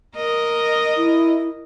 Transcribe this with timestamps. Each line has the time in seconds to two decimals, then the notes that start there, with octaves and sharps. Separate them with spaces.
0.16 A#4 D#5
0.97 E4